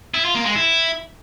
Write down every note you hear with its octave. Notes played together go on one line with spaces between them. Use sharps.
E4
F4
A#3
G#3
E4